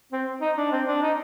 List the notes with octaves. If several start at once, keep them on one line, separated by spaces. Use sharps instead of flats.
C4
D#4
D4
C4
D4
D#4